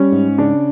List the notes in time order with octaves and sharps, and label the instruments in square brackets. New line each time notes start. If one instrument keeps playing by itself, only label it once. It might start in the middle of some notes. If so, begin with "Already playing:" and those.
Already playing: [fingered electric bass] G3 [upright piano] C#4
[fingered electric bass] G#2
[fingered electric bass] C#3 [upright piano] D4